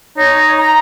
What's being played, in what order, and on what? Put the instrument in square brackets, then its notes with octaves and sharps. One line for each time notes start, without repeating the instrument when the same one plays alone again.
[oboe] D#4 [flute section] C#5
[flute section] A#5